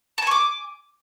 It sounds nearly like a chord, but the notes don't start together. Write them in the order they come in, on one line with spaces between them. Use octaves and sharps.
A5 G#5 C#6 D6